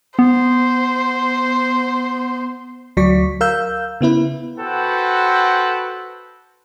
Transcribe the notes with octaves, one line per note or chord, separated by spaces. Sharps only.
B3 C5
D2 F#3 D5 C#6 B6
A#4 F5 E6 G6
C#3 B3 E4 B4
F#4 A4 B4 C5 F#5 G5